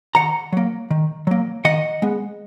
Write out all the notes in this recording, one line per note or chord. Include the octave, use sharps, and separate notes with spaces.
D#3 F#5 A#5
F#3 A#3
D#3
F#3 A#3
D#3 D#5 F#5
G#3 B3